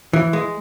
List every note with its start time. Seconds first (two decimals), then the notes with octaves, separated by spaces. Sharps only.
0.13 E3
0.33 G#3